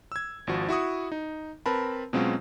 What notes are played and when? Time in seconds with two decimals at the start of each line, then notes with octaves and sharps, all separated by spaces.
0.12 E6 G#6
0.47 G#1 F3 F#4
0.69 E4 F#4 C#6 D#6
1.12 D#4
1.66 C4 A#4 B4 A5 B5
2.13 B2 F#3 G#3 C4 C#4 F4